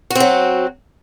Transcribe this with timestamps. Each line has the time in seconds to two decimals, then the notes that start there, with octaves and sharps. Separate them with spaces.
0.10 F#4
0.15 C4
0.20 F#3